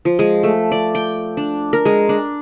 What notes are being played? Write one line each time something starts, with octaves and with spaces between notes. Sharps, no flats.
F3
G#3
A3
D5
G5
D4
A#4
G#3
D4